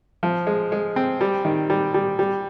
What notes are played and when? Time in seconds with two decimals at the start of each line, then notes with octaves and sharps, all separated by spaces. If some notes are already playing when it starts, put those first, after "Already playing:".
0.23 F3
0.47 G#3
0.72 G#3
0.96 C4
1.21 G3
1.45 D#3
1.70 G3
1.94 G3
2.19 G3